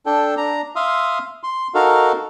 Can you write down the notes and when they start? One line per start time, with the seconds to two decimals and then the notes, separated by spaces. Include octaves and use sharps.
0.06 D4 A4 G5
0.37 D4 A#5
0.76 E5 F5 C6 D#6
1.43 C6
1.75 D#4 F#4 A4 A#4 F5